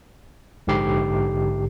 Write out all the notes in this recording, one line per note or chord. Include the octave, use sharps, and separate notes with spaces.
A#1 G#2 D3 G4 C7